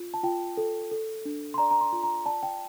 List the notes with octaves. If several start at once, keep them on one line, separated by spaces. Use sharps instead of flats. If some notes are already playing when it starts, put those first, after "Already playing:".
Already playing: F4
A5
F4 G5
A4
A4
D4
C6
D5 A#5
A#5
C6
F4
A#5
D5 A5
G5